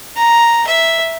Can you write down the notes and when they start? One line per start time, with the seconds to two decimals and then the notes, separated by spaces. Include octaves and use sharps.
0.16 A#5
0.67 E5